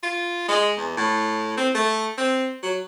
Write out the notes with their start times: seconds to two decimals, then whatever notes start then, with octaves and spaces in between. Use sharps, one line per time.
0.03 F4
0.48 G#3
0.78 E2
0.97 A2
1.57 C4
1.74 A3
2.18 C4
2.63 F#3